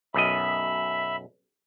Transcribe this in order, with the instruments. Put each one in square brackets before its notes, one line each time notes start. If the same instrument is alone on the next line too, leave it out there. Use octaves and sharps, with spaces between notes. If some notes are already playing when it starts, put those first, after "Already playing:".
[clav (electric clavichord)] B1 F#2 D#5 [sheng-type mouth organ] E5 B5